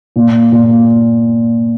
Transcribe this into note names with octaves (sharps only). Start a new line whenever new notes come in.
A#2
A#2